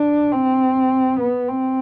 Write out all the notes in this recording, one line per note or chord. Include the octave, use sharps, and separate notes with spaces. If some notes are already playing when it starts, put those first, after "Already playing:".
Already playing: D4
C4
B3
C4